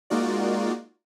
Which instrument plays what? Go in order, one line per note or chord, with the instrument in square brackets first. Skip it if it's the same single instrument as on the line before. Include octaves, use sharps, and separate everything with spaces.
[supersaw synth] G#3 A#3 D#4 F4 F#4 D5